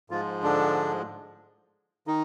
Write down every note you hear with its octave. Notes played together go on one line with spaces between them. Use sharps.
G#2 F3 G#3 F4
D3 D4
D#3 D#4